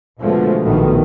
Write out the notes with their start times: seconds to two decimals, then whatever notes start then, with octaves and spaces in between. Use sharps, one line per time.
0.20 B2 D3 F3 G#3 A3 B3
0.65 A#1 G#2 B2 D#3 A3